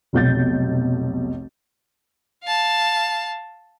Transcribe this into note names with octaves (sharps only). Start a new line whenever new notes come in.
F1 B1 G6 A6
F5 A5